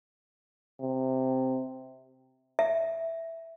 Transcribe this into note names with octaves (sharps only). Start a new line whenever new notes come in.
C3
E5